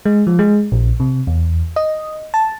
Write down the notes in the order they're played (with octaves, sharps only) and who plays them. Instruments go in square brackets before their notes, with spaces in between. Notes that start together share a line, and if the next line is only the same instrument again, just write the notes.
[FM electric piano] G#3
F3
G#3
A#1
C3
E2
D#5
A5